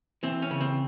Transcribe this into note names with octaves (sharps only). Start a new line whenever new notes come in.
E3 C4
C#4
C#3
C4